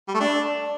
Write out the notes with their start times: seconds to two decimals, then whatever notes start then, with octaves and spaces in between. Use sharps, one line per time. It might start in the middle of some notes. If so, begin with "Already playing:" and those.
0.08 G3
0.14 A3
0.20 D4